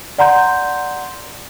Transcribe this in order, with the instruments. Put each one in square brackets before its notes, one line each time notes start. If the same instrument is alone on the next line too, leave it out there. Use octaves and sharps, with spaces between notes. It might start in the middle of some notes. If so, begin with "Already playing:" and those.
[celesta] D5 F#5 A#5 C6 G6